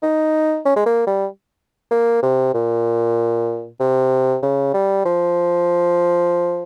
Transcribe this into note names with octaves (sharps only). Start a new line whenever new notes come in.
D#4
C#4
G#3
A#3
G3
A#3
C3
A#2
C3
C#3
G3
F3